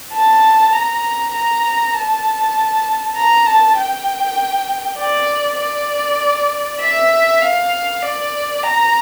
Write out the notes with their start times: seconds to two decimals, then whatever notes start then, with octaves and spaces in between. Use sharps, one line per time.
0.13 A5
0.73 A#5
1.33 A#5
1.94 A5
3.16 A#5
3.46 A5
3.77 G5
4.98 D5
5.59 D5
6.80 E5
7.41 F5
8.03 D5
8.63 A#5